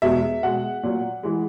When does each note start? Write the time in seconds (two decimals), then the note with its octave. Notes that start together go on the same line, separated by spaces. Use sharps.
0.02 E2 B2 G#3 E5
0.43 B2 G#3 F#5
0.83 A#2 F#3
1.23 E3 G#3